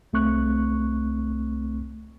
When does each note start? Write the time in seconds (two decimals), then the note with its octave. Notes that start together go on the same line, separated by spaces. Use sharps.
0.13 C2 A3 C4 C#6 F#6